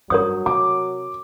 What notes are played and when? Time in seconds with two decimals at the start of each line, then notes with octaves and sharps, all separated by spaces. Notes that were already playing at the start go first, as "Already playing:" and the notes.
0.10 G2 F#3 A#4 C#5 D#6
0.46 C3 D6